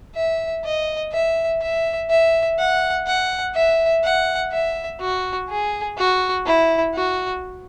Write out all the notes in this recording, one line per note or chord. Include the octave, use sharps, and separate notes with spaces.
E5
D#5
E5
E5
E5
F#5
F#5
E5
F#5
E5
F#4
G#4
F#4
E4
F#4